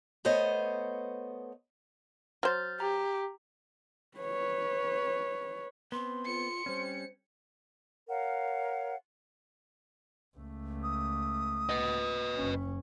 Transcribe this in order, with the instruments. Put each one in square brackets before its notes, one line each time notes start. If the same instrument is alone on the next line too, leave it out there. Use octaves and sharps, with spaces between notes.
[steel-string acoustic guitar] A3 B3 C5 C#5 D#5
[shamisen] F#3 C5 [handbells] F6 G6 A6
[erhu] G4 [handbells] A#5
[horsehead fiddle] B4 C#5
[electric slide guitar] B3 C4 [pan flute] C6
[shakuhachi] F4 [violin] C#7
[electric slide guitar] G3 C4 C#4 [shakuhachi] C5
[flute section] A#4 C#5 F5 F#5
[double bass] C#2 A3
[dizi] D#6
[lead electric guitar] B4 D#5
[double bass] F#1 C#4